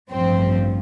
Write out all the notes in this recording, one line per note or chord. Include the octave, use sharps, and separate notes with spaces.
A1 G2 F3 C4